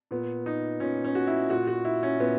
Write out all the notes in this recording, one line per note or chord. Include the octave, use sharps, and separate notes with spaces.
A#2 B3
D#4
A#2 C#4
C#4
F#4
E4
A#2 F#4
F#4
E4
C#4
A#2 B3